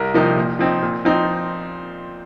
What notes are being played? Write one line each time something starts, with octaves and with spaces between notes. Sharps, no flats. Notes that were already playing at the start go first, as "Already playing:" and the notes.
Already playing: C2 A#4
C3 F3 A#3 D#4
A#2
F3 C4 D#4
A#2
F3 C4 D#4